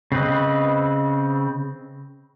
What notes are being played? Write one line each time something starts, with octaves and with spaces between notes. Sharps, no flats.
C#3 C4 B4 D#5